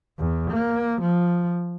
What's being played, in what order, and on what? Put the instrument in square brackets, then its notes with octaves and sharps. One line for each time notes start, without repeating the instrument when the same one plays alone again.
[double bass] E2
A#3
F3